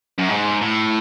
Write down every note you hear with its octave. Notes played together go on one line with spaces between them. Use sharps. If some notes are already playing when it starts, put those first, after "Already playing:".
F#2
G#2
A2